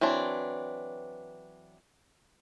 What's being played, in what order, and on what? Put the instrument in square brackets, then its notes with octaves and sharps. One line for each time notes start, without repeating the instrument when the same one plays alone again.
[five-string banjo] E3 F#3 C4 D4